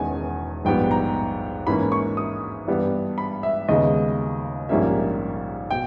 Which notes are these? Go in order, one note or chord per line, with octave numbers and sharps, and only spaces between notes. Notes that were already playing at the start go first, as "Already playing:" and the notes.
Already playing: E1 E2 D#3 G#3 C#4 G#5
A#1 G#2 G3 B3 G5
A#5
G#2 E3 A#3 C#4 B5
C#6
D#6
G2 E3 G3 B3
B5
E5
D#2 C#3 G#3 B3 D#5
A#1 G#2 G3 A#3 C#4 E5
B2 G5